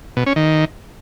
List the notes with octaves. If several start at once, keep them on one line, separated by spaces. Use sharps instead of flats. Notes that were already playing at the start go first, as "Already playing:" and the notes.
B2
C#4
D#3